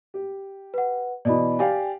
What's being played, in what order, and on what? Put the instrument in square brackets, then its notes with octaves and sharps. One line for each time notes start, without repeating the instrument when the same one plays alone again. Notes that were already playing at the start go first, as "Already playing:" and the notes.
[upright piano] G4
[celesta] B4 F#5
[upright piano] B2 E3 [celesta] D5 D#5 B5
[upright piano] G4 D5 F5 [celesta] G5 G#5